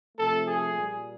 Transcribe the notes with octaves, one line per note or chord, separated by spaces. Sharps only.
C3 F3 A3 A4
G#4
A#2 G3